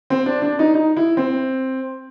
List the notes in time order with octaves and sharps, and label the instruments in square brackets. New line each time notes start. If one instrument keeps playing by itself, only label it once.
[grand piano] C4
D4
D4
D#4
D#4
E4
C4